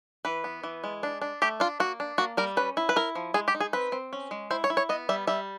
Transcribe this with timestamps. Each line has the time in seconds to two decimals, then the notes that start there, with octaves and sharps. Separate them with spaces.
0.25 E3 B4
0.44 B3
0.64 E3
0.84 G#3
1.03 D4
1.22 D4
1.42 A3 G4
1.60 D4 F4
1.80 A#3 F#4
2.00 D4
2.18 A#3 F#4
2.37 G3 A#4
2.57 C#4 B4
2.77 E4
2.89 B4
2.96 E4 A#4
3.15 F3
3.34 G#3 G#4
3.48 G4
3.55 D#4
3.60 G#4
3.73 C4 B4
3.92 C4
4.13 C#4
4.31 G#3
4.51 E4 C5
4.64 C#5
4.70 E4
4.77 C#5
4.89 B3 D#5
5.09 G3 E5
5.27 G3 E5